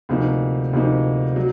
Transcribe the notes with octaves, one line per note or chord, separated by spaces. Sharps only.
D2 C3 F3 A#3 D#4
D2 C3 F3 A#3 D#4
F#3